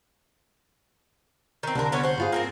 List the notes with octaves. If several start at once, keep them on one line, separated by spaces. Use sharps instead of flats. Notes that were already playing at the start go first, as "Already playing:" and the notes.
D#3 C4
C2 D3 D4 A#4
B3 C#4 C#5
C5 F#5
G2 F4 G#4
A#3 C4 A#4